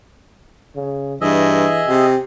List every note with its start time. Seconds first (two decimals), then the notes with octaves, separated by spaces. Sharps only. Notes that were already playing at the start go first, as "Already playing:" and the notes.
0.75 C#3
1.21 G2 E3 G#4 D#5 E5
1.88 C3 G4